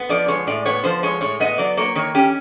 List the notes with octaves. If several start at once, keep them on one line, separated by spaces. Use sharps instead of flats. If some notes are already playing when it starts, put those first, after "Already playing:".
Already playing: B3
F3 D5
G#3 C#5
A2 D5
B3 C#5
F3 C5
G#3 C#5
A2 C#5
B3 D#5
F#3 D5
A#3 C#5
D#3 C#5
C#4 G4